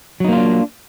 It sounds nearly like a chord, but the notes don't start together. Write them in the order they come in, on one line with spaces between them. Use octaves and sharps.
F#3 D#4 A#3 F4 D4